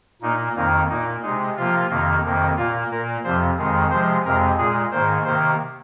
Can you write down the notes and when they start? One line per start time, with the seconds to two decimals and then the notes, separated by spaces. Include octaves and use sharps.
0.22 A#2 A#3 D#4
0.55 F2 D#3 A#3 D#4
0.89 A#2 A#3 D#4
1.22 C3 G#3 D#4
1.56 C3 F3 A#3 F4
1.90 F2 C3 D#3 A#3
2.24 F2 C3 D#3 A#3
2.56 A#2 A#3 F4
2.90 A#2 A#3 A#4
3.24 F2 C3 F3 C5
3.57 F2 D#3 G#3
3.91 C3 F3 G#3 C5
4.24 F2 C3 G#3 A#4
4.58 A#2 G#3 G#4
4.91 G#2 D#3 A#3 C5
5.25 C3 D#3 A#3 C5